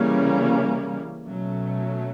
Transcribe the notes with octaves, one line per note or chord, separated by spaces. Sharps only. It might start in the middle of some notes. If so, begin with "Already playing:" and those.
Already playing: C#3 E3 G3 A#3 C#4
B2 F#3 A3 C#4